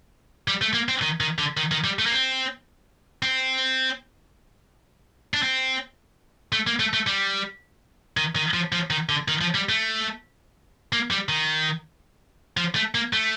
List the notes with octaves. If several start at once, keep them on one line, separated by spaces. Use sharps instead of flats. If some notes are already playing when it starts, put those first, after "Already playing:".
G3
A3
A#3
C4
D#3
D#3
D3
D#3
D#3
G3
A3
A#3
C4
C4
D4
C4
A3
A#3
A3
A3
G3
D#3
D#3
F3
F3
D#3
D3
D#3
F3
G3
A3
A#3
G3
D#3
F3
A3
A#3
A3